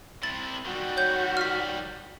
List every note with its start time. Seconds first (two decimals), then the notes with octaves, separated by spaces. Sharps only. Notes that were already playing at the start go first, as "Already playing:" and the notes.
0.23 C3 E4 A6
0.65 D#3 G3 F#4
0.97 C#5 G6
1.37 F6 B6